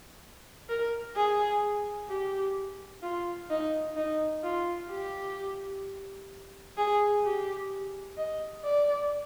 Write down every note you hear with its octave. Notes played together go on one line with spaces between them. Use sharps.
A#4
G#4
G4
F4
D#4
D#4
F4
G4
G#4
G4
D#5
D5